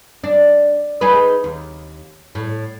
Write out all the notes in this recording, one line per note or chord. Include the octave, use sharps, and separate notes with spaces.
D4
D#4 G#4 B4
D#2
A2